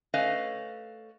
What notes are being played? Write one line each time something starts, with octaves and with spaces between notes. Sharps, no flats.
A3 C#4 B4 C#5 D#5 F5